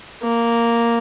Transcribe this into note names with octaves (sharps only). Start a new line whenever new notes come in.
A#3